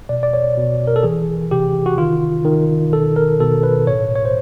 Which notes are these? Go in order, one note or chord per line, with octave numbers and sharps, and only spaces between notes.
B2 D5
D5
C#5
B2
A#4
A4
E3 G#4
C3 G4
F#4
D#3 F4
D#3
B2 A4
A#4
B2 A4
B4
A2 C#5
C#5
C5